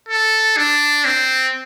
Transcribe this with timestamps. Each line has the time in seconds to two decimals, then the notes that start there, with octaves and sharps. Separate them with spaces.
0.09 A4
0.57 D4
1.05 C4